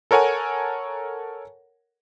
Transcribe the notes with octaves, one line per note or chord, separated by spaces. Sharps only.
A4 A#4 C#5 F#5 G#5